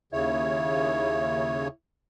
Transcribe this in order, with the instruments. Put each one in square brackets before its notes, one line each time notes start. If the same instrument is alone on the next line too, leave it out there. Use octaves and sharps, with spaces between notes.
[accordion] D#2 C#3 C#5 [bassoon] E4